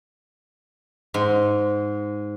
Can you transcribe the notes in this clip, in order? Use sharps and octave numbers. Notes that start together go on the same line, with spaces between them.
G#2